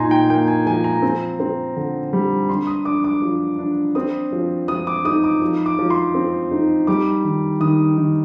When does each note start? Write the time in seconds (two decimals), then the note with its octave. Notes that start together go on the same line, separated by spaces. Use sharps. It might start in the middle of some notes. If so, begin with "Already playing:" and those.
Already playing: A#2 D#4 G#5 A#5 C6
0.11 G5
0.30 A#3 G5
0.48 G#5
0.66 F3 G#5
0.84 A#5
1.02 C4
1.40 C4
1.76 D3
2.13 G3
2.49 D4 C6
2.67 D#6
2.85 D4 D6
3.04 D6
3.22 F3
3.58 D4
3.95 C4 D#6
4.32 F3
4.68 F3 D#6
4.87 D6
5.05 D#4 D#6
5.24 D6
5.42 F3
5.66 D6
5.79 F3
5.90 C6
6.15 C4
6.51 D#4
6.87 G3 D6
7.24 D#3
7.60 D#3 D#6
7.97 D#3